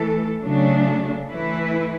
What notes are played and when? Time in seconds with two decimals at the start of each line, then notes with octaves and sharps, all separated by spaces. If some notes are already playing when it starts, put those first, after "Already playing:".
Already playing: E3 A3 A4
0.43 C#3 F#3 A3 D4
1.30 E3 A3 E4 B4